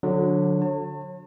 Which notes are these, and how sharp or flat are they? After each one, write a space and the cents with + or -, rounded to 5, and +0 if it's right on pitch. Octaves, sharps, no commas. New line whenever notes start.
D3 +0 F#3 -30
C#5 -35 A5 +40